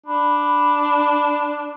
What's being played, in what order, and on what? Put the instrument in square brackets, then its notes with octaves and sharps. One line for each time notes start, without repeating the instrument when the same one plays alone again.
[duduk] D4 [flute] B5